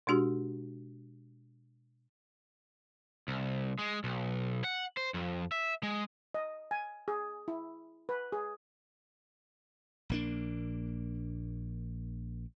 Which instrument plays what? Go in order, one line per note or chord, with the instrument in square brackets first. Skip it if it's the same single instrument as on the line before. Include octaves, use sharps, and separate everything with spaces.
[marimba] B2 G#3 D4 F#4 G4
[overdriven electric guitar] C2
G#3
B1
F#5
C5
F2
E5
G#3
[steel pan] D#5
G#5
G#4
E4
B4
G#4
[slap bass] A#1 A#3 D4